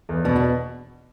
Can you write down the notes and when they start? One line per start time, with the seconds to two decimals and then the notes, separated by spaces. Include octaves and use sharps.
0.09 E2
0.25 B2 B3 D4
0.35 D4 F#4